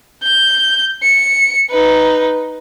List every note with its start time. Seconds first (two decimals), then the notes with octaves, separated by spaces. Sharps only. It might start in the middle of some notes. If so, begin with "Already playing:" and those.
0.24 G6
1.03 C#7
1.70 D#4 B4